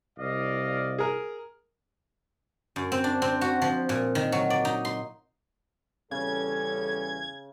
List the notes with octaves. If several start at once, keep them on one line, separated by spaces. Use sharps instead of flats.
C2 D5 D#5 F5
G#4 A#4
F#2
C4
D4
C4
F#4
F3
A#2
D#3
F#3
D5
D#4
C6
E2 C#3 G3 C#4 A4 G#6